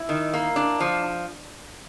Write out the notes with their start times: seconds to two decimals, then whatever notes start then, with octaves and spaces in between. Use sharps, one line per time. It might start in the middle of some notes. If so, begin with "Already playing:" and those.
Already playing: E4
0.09 D#3
0.33 A#3
0.56 D4
0.80 F3